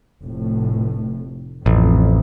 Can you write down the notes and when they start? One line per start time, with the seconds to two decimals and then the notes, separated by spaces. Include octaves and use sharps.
0.23 F1 A2
1.66 A1 F2